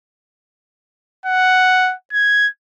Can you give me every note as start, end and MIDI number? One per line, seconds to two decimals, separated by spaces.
1.26 1.94 78
2.13 2.48 92